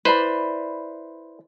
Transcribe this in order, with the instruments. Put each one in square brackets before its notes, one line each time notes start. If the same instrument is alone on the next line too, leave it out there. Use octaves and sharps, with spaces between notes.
[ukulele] E4 D5 B5 [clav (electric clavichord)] B4 C5